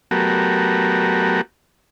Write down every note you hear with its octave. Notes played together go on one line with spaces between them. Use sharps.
F#3 A3 B3 F#4 G4 A#4